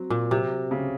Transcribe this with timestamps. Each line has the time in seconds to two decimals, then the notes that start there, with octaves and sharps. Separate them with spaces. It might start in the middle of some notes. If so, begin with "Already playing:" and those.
Already playing: F#3 C4
0.10 A#2
0.31 C3 F#3
0.71 C#3